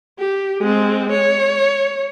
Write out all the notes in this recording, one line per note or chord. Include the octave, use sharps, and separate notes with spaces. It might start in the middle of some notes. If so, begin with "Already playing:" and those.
G4
G#3 C4
C#5